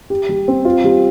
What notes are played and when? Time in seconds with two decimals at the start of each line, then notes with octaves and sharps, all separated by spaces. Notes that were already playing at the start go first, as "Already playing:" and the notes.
0.10 G4
0.29 G3
0.48 C4
0.65 F4
0.84 G3